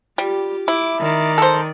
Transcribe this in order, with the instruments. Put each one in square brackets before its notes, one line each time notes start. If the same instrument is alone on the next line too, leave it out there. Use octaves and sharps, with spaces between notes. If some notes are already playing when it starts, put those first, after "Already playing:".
[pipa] G3 [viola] F4 G4
[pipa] E4 [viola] D6
[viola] D#3 D5
[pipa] A4 C5